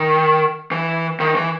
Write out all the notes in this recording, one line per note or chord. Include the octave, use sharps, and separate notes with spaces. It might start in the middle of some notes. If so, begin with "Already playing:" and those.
Already playing: D#3
E3
D#3
E3